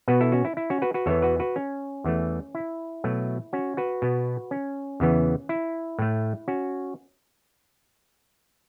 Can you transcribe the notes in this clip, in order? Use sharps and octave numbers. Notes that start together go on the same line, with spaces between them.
B2 B3 F#4 B4
E4 A4
C#4 F#4
E4
E4
C#4 F#4
F#4 B4
F#4 B4
E2 E3 B3 A4 C#5
F#4 B4
F#4 B4
C#4
E2 E3 A3
E4
B2 F#3 A3
C#4 F#4
F#4 B4
B2 B3
C#4
E2 C#3 E3 B3
E4
A2 A3
C#4 F#4